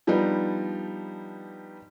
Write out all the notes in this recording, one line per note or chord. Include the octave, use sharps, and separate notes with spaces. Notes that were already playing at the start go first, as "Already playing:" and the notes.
F3 G3 B3 D4 D#4 B4